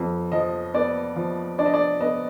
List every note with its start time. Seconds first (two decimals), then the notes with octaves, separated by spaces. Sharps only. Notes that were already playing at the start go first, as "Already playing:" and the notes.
Already playing: F2 B3
0.32 F3 D#5
0.74 B3 D5
1.16 F3
1.58 D4 D5
1.66 D#5
1.74 D5
2.00 B3 D#5